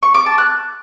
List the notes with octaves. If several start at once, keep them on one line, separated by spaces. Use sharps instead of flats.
C#6
D6
A5
F#6